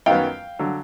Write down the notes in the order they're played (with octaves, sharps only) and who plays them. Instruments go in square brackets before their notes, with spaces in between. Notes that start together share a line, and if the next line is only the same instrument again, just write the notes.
[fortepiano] F#2 D#3 F#3 B3 F5 G5
D3 F#3